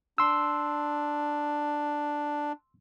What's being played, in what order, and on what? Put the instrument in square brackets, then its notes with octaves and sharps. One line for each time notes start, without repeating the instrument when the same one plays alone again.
[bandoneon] D4 [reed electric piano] C6 E6